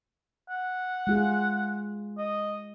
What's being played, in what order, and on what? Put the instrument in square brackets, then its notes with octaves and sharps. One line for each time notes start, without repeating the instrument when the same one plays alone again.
[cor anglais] F#5
[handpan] G#3 F4 G#4
[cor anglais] D#5